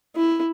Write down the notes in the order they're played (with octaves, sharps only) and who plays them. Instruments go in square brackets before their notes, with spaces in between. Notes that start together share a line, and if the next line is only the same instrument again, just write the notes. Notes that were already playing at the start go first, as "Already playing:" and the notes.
[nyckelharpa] E4